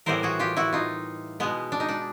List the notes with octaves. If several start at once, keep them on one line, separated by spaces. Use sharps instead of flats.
A2 E3 G3 B3 A#4 C5
F#4 G#4
F4 G4
E4 F#4
D#4 F4
B2 G#3 B3
D4
D#4
D4